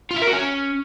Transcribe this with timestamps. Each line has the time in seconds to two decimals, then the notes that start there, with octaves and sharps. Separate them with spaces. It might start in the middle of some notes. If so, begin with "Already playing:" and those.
0.11 F4
0.16 E5
0.22 A#4
0.28 F#4
0.33 C#4